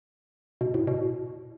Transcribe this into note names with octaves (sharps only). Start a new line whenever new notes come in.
B2
A2
B2